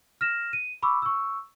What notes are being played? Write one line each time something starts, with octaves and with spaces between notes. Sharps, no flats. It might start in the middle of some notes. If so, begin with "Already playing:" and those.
F6 A#6 E7
D#7
B5 C#6 D6 E6
C#6 E6